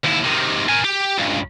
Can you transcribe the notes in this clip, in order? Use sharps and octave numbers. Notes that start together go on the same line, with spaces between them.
D#2 E4
C3 D#3
A#4 G#5
G4
C#2 G2